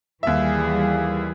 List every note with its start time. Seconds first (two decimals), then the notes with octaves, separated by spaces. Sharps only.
0.23 D#2 E3 G3 G#4 E5